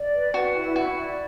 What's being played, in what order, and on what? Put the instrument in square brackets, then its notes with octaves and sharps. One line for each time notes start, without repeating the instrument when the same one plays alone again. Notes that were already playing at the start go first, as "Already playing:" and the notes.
Already playing: [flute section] D5
B4
[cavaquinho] F#4 [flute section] B4
[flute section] E4
[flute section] E4 [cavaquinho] F#4
[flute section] D5